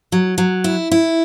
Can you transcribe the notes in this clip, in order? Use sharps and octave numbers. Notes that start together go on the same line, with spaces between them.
F#3
F#3
E4
E4